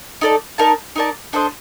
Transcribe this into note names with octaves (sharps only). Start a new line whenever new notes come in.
D#4 A4 D5
D#4 A#4 D5 A5
D#4 A#4 D5 A5
D4 A4 C5 D#5